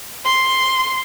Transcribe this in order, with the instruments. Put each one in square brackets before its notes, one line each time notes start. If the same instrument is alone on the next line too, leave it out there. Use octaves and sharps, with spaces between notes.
[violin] C6